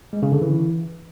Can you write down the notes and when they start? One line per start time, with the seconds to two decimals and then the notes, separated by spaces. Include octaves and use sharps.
0.13 G#3
0.22 C#3
0.32 D3
0.42 E3